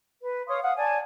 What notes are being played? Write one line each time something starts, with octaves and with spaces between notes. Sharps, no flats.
B4
C#5 F5 C6 D#6
F5 F#5 D#6
D5 G#5 A5